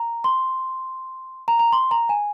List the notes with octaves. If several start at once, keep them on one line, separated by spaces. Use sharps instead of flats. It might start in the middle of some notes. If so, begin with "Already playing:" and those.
Already playing: A#5
C6
A#5
A#5
C6
A#5
G#5